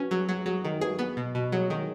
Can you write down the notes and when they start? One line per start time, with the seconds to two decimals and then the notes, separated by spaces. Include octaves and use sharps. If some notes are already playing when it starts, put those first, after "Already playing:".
Already playing: C#4 F#4 B4
0.11 F#3 G#4
0.28 F#3 F#4
0.46 F#3 G#4
0.64 D#3 G#4
0.81 F#4 G#4 B4
0.99 B3
1.17 B2
1.35 B2
1.52 F#3 G#4 C#5
1.69 D#3 G#4 C#5